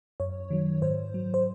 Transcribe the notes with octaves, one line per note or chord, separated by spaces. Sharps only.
F#2 C#5
D#3 F#3
G#2 C5
F#3
C5